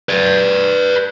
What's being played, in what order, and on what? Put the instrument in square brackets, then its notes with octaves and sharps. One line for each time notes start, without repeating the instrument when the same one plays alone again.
[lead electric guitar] B4 D5